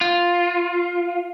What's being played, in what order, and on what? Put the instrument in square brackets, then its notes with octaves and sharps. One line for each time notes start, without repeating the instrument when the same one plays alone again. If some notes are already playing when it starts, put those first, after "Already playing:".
[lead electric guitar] F4